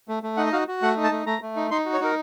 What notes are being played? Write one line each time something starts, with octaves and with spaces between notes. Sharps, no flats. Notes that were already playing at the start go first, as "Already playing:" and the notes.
A3
A3
D#4 F#5
D#5
F#4 F5
F#4
A3 F#5
D#4
A5
A3
A3 A#5
A3
D#4
D#4 C6
F#4
C#5
D#4 A#4